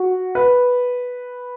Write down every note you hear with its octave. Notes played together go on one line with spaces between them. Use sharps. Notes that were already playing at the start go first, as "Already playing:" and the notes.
Already playing: F#4
B4